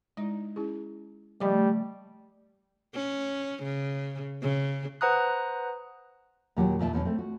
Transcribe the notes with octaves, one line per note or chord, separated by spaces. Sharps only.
G#3 D#4 E4
C#4 E4 G#4
C#3 F3 G3 A3 D#5 F5
C#4
C#3
C#3
B4 C5 F#5 A#5 D#6 F#6
D#2 A#2 F#3 G4 F#5
D#2 A#2 E5 A5
E2 B2 C4 C#4
A3 C4
F#4